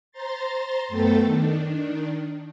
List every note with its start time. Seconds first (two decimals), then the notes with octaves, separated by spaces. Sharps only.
0.12 C5 A#5 C6 A6
0.88 F#2 A3 B3 A4 G5 A6
1.24 D#3 D4